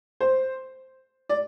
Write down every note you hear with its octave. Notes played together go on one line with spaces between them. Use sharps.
C5
D5